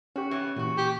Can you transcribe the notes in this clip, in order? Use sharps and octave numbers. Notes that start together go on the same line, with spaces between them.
C#4 F#4 G4
E3 B3
A#2 C#3 E3 F#4
G4